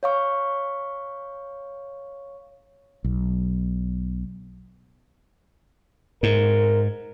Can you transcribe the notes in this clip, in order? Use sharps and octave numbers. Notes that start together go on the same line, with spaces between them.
C#5 F5 C#6
B1
G#2 A#4